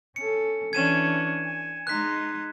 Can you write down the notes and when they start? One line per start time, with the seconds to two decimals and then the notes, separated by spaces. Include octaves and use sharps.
0.16 C#4 A4 C#7
0.73 E3 C#4 D4 G#6 D#7 E7
1.45 G#5
1.87 G#3 D#4 C6 F#6 B6